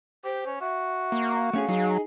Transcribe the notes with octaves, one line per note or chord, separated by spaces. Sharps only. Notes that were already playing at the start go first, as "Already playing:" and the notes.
G4 C5
C#4
F#4 E5
A#3
A3 C#4 G#4 F5
F#3 D#4 G#4